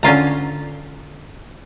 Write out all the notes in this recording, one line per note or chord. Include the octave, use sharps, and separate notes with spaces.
D3 C#4 F4 A#5